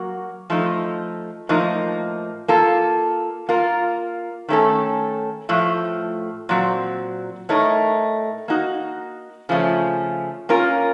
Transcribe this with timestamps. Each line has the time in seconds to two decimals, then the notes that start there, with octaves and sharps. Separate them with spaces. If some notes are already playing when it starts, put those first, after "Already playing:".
Already playing: F#3 A#3 F#4
0.50 F3 A3 D#4
1.49 A2 F3 A#3 D#4
2.48 A#3 F4 A4
3.49 A#3 F4 A#4
4.49 D#3 A3 C#4 A4
5.49 A2 F3 A3
6.49 A#2 F#3 C4
7.49 A2 A3 D#4 A#4 C#5
8.48 A#3 D#4 F#4
9.49 C#3 F3 A3 C#4
10.49 A#3 C#4 F4 A#4